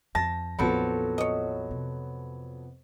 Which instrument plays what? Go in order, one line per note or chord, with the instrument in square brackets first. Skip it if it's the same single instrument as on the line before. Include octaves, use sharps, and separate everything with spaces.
[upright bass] F2 [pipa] A5 [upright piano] A#6
[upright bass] A#1 D#3 [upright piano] F2 B3 B5 [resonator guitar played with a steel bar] F3 F#3 A4
[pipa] C#5 D#5
[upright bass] C3